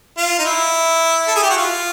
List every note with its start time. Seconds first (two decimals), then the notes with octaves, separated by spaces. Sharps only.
0.17 F4
0.39 D#4
0.45 E4
1.28 A4
1.35 G#4
1.42 G4
1.50 F#4
1.57 F4